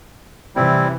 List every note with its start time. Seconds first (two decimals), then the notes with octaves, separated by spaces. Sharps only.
0.56 C3 E3 G3 C4 E4